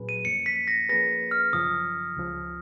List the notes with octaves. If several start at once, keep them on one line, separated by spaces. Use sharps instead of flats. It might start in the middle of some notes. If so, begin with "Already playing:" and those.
Already playing: A#2 F#3 C#4 G#4 B4
D#7
F#2 F3 A#3 C#4 C#7
B6
A#6
F3 A#3 C#4 G#4 B4 A#6
F6
F#2 C#3 F3 D#6
C#2 C#3 F3